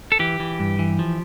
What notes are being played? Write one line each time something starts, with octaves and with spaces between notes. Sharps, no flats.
A4
E3 G4
E3
G2
E3
F3